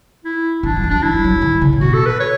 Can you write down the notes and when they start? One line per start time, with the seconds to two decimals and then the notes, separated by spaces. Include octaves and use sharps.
0.25 E4
0.63 E3 D4
0.77 F#3
0.84 E3
0.89 F#3 D4
1.03 F#3 E4
1.14 G3
1.24 F#3
1.42 D3
1.61 C#3
1.73 A2
1.81 B2 F#4
1.93 A4
2.06 B4
2.20 C#5